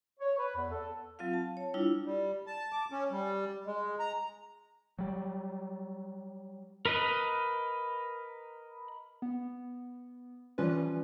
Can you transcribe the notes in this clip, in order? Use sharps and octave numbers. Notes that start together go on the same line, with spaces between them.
C#5
B4
E2
A4
F#3 C4 F4 F5
A5
C#5
G3 D4 E4 F4
G3
A5
D6
C#4
G3
G#3
A#5
F#3 G3
A#4 B4 D#5 F#6
B3
E3 F3 G3 C#4 F4 B4